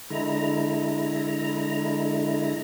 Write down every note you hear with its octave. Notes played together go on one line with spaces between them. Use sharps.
D3 G#3 E4 A#5